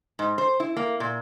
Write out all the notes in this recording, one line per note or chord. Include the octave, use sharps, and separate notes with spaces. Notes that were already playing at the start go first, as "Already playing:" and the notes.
G#2
C5
E4
A#3
A#2